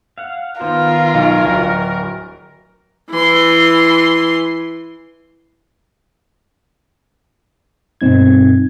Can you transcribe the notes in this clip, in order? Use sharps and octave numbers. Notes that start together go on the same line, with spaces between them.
F5 F#5
D#3 B3 F4 A#4 C5
B1 C#5 G#5 A5
D1
E3 C6
G2 B2 C4 D#4 G#6